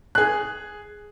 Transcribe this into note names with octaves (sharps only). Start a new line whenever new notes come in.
G#4 F#6